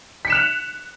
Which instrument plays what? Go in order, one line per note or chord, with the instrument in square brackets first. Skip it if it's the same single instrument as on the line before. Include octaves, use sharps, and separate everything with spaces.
[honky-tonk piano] B6
C#7
E7
F#6
F7